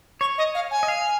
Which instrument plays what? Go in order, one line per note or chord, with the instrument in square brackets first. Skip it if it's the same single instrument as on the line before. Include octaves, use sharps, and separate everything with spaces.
[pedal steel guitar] C#5 [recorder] C#6
[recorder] D#5
F5
G#5
[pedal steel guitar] D#5
F5